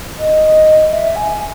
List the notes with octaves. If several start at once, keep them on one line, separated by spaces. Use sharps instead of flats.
D#5
E5
G#5